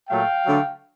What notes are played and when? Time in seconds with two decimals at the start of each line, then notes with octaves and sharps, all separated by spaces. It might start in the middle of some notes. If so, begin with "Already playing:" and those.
0.09 A#2 F#3 A3 F5 G5
0.46 D3 F#3 A3